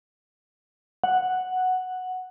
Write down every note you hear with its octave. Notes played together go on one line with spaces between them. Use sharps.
F#5